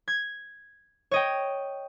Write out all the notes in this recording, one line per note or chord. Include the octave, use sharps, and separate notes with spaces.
G#6
C#5 D#5 G5